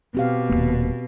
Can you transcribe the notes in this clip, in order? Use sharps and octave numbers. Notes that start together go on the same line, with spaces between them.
B2 C4 G4 F5
D#1 C#2 A#3